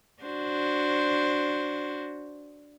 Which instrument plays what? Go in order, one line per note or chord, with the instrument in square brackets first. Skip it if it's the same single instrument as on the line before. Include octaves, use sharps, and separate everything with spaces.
[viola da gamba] D4 F#4 C5